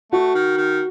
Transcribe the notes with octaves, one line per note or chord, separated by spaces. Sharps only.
A3 F#4
D#3
D#3